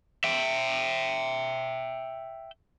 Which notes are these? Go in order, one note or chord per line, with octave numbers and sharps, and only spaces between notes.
E5 G5